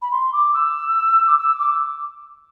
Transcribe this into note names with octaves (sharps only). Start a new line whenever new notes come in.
B5
C6
D6
E6
D6
E6
D6